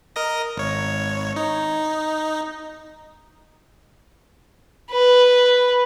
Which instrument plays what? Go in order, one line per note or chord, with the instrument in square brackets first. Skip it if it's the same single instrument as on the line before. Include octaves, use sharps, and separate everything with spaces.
[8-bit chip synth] A#4 D#5 A#6
G#1 C#5
D#4
[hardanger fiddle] B4